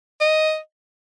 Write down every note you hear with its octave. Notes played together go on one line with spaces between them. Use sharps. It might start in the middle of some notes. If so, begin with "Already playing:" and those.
D#5